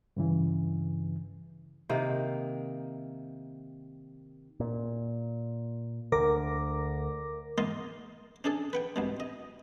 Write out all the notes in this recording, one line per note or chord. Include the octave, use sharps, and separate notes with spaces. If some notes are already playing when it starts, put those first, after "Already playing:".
G2 C#3 E3
C3 D#3 A#3
A#2
D2 D3 A#4 D6 A#6
G#2 A#3 F4 D#5 C6
C#4 D4 G#4 A4
B4 F#5 G5
C2 G#2 B2
D#5